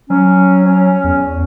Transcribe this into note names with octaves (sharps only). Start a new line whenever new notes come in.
F#3 C#4
C#4
E2